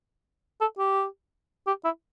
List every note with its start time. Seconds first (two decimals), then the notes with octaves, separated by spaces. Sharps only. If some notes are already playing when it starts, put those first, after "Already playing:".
0.61 A4
0.78 G4
1.67 G4
1.84 E4